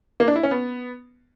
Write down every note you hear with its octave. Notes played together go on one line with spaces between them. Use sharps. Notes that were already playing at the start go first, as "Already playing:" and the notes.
A#3
D4
E4
C#4
B3